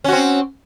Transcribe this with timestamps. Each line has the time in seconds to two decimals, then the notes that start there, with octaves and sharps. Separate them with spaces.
0.04 C#4
0.08 F#4
0.12 C4